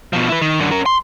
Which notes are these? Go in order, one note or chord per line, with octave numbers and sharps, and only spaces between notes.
B2 F3
E4 B4
D#3
F#2 D3
C#4 A#4
C6